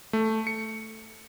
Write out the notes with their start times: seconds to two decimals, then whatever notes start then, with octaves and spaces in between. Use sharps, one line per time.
0.13 A3
0.47 C#7